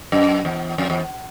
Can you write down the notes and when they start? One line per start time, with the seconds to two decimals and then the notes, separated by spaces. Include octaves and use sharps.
0.12 F#2
0.45 E2
0.78 F2
0.90 E2